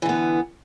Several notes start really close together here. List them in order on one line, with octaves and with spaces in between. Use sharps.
E3 D3 B3